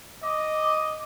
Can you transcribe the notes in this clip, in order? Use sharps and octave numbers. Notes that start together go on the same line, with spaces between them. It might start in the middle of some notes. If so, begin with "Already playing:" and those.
D#5 D6